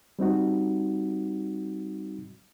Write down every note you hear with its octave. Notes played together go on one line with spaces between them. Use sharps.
G3 C4 D#4 F#4